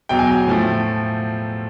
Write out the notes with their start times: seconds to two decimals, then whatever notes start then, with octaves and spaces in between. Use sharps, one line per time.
0.09 E2 B2 F#3 G5
0.19 G#5
0.27 G5
0.47 A2 F3 A3